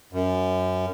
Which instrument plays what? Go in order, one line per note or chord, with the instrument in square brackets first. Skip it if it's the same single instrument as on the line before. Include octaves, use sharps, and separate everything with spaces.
[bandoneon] F#2